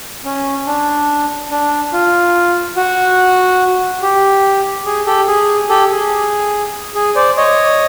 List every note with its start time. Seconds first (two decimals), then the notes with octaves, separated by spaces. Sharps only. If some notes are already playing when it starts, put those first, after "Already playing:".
0.25 C#4
0.67 D4
1.51 D4
1.93 F4
2.77 F#4
4.02 G4
4.86 G#4
5.06 G4 A4
5.28 G#4
5.69 G4 A4
5.90 G#4
6.95 G#4
7.16 C5 D5
7.37 C#5 D#5